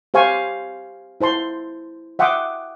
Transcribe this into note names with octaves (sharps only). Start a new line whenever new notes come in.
G4 C5 F5 G#5 C#6
E4 C5 A5 C6
E5 F#5 G5 C6 D6 D#6